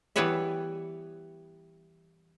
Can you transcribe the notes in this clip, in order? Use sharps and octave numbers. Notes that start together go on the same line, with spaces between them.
E3 G3 B3 B4 C#5 E5